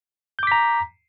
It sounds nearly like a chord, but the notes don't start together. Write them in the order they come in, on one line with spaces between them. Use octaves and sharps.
G6 D6 B6 A#5